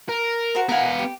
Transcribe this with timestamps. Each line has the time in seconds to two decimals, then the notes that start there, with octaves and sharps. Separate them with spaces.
0.09 A#4
0.55 F#4 C5 A#5
0.69 B3 A#4 F5 F#5 G#5
0.99 G4